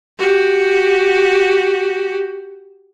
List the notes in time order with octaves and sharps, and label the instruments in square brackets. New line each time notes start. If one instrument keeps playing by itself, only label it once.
[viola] F#4 G4